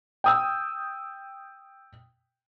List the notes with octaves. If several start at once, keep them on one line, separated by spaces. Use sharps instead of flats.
G5 D#6 E6